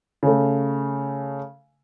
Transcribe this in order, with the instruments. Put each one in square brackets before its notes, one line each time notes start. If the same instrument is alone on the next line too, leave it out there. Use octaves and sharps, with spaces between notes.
[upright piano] C#3 A3